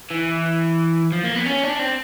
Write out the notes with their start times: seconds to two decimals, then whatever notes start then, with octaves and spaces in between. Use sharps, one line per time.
0.11 E3
1.12 F3
1.24 A#3
1.35 B3
1.46 C#4
1.63 D4
1.79 C4